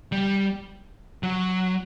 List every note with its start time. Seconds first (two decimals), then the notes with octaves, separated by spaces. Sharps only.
0.12 G3
1.23 F#3